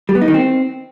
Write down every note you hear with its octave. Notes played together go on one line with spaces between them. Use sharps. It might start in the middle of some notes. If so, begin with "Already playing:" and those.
G3
B3
D#4
D#3
C4